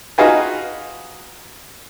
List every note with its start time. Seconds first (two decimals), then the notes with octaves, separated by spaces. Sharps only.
0.18 D#4 F4 F#4 G#4 B4